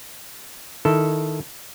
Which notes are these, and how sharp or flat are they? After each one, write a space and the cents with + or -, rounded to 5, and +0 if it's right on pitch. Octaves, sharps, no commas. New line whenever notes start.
D#3 +0 E4 +0 A4 +0